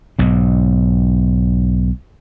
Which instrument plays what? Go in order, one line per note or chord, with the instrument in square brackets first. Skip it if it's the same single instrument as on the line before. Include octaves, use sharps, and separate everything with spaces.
[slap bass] B1 G#2